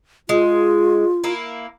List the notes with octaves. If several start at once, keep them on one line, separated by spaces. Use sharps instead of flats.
G#3 F4
A#3 E4